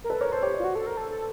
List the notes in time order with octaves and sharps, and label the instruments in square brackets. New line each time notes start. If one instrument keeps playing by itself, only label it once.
[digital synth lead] A#4
[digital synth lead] A4 [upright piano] B4
[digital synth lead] A#4 [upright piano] C#5
[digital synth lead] A4 [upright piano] C5
[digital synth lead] G4 [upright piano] C#5
[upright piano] D5
[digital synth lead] F4
F#4
A4
A#4
A4
A4